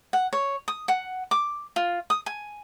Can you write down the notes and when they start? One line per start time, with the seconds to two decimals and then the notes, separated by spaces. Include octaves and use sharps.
0.13 F#5
0.33 C#5
0.68 D#6
0.88 F#5
1.31 D6
1.76 F4
2.10 D#6
2.26 G#5